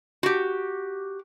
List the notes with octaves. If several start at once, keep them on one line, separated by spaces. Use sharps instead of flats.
F#4 G4